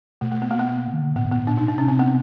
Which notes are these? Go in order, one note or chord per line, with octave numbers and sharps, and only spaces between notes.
B2 A3
A3
B3
A#3
B3
D#3
D3
A2 B3
G#2
A2 A#2 B3
A#2 D4
D#4
B2
D4
C3 C#4
C4
B3